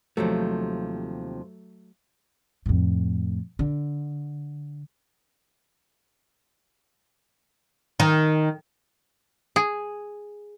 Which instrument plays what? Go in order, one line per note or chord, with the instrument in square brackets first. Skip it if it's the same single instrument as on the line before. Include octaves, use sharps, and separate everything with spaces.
[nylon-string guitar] D#2 C3 F3 [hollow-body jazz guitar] F#3 A3
[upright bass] F2 A2
D3
[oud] D#3
[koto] G#4